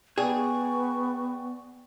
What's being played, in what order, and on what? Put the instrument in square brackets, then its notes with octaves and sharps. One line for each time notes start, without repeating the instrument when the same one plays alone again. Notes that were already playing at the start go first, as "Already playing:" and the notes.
[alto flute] B3 [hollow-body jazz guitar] G#4 [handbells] D5 G5 [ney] C#6